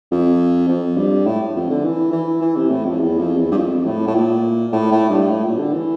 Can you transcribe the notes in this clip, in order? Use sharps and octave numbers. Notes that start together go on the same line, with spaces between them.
F2
F2
G2
A2
F2
D3
E3
E3
E3
C3
A2
F2
E2
F2
E2
G2
F2
A2
A2
A#2
A2
A2
G2
A2
A#2
D3
E3